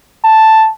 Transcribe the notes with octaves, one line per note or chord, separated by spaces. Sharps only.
A5